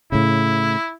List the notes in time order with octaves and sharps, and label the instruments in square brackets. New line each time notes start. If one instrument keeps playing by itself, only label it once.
[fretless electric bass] A2 C#3 [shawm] E4